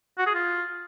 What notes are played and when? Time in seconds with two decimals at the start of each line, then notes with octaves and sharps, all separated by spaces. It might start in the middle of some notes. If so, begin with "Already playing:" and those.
0.18 F#4
0.26 G#4
0.35 F4